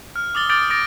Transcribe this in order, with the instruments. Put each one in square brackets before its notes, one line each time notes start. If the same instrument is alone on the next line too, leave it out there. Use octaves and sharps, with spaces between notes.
[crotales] F6
D6 D#6 A6 G7
D6 D#6 F6 G6 A6 D7
D6 D#6 A6 A#6 D7